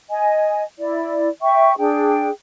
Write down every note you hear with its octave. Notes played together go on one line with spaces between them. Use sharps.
D#5 G#5
E4 D5
E5 G5 C#6
D4 G#4 G5